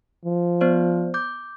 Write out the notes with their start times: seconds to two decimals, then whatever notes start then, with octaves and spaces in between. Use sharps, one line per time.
0.25 F3
0.61 B3 C5 D5
1.14 D6 G6